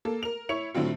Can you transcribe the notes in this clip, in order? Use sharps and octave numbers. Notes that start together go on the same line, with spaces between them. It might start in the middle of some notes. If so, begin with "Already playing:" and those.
A#3 A4
A#4 F7
E4 C#5 C#7 F7
A2 D3 F#3 C4 F4